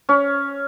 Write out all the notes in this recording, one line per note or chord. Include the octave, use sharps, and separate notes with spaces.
C#4